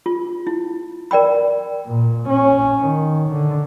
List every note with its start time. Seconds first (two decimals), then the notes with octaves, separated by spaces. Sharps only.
0.06 F4
0.47 E4
1.11 A#4 D5 G5 B5
1.87 A#2
2.30 C#4
2.79 D#3
3.29 D3